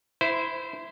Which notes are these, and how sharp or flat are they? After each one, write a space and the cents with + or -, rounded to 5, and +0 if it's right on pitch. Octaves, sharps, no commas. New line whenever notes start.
E4 +0 C5 -20